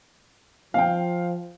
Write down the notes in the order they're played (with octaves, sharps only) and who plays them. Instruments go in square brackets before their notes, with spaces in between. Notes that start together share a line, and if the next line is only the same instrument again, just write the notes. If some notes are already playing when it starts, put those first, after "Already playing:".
[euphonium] F3 [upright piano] F5 G5